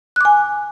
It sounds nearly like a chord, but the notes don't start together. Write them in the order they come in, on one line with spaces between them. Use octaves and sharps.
F#6 D6 G#5